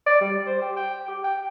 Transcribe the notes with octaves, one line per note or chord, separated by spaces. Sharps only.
D5
G3
C5
G4
G5
G4
G5